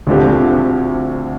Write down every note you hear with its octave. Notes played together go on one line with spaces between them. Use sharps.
D2 D3 F3 C4 G4